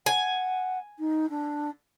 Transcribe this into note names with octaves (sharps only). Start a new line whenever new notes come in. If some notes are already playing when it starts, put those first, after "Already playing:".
F#5 G#5
D#4
D4